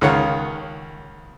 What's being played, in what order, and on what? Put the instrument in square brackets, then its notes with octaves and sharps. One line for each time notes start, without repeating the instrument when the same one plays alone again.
[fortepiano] C#2 D#3 C#5 F5 F#5